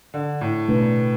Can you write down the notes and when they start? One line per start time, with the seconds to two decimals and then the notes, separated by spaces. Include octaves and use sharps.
0.14 D3
0.41 A2
0.68 B2 A3 D4 B4